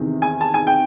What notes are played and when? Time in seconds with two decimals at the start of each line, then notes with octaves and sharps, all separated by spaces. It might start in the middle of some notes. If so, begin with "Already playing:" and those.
Already playing: E2 C3 D#3
0.22 G#5
0.41 A5
0.54 G#5
0.67 G5